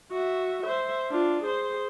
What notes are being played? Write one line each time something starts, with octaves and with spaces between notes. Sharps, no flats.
F#4 E5
C5 E5
D4 F4
G#4 C5